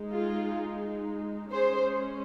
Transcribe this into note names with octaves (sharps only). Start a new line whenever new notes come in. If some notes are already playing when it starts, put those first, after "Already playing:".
Already playing: G#3 D#4
F4 G#4
G#3 C#4 G#4 C5